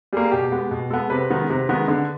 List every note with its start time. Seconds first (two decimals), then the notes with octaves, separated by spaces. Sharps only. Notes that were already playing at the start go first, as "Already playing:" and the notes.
0.13 G3 A#3 G#4
0.32 B2 G4
0.52 G#3 B3
0.71 B2
0.90 G#3 B3 A4
1.10 C3 B4
1.30 D#3 G#3 B3
1.50 C3
1.69 D#3 G#3 B3
1.88 D3